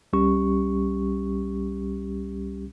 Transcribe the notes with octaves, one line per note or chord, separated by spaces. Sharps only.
C2 G3 C#4 G4 C#6